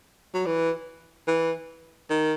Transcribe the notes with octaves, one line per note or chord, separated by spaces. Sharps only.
F#3
E3
E3
D#3